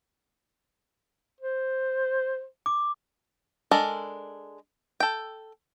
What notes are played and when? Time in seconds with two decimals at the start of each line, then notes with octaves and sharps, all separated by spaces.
1.41 C5
2.66 D6
3.71 G#3 D4 A4 A#4
5.00 A4 G5